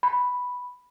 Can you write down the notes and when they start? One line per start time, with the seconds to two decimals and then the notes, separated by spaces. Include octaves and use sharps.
0.03 B5